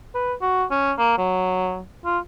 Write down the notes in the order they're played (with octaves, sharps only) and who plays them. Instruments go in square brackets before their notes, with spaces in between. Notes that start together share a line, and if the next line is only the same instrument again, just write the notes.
[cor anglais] B4
F#4
C#4
A#3
F#3
F4